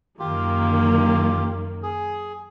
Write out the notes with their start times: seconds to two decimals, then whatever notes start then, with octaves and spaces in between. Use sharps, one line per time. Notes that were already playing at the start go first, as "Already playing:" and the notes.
0.19 F#2 D#3 A#3 F4 G4
1.83 G#4